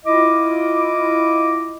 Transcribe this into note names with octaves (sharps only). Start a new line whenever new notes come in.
E4 F4 D#5 D6